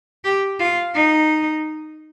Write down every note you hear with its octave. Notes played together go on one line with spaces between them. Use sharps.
G4
F4
D#4